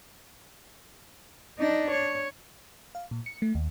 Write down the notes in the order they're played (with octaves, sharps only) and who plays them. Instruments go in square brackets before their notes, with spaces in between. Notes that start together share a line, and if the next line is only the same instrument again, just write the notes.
[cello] D4 D#4
C#5
[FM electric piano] F5
A#2
C#7
A3
D#2